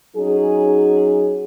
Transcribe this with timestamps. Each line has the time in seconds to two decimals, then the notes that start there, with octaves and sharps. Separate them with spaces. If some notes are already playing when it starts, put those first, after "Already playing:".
0.16 F#3 C#4 D#4 G#4